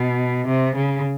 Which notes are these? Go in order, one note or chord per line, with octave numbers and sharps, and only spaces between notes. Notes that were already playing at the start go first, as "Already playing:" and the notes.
Already playing: B2
C3
C#3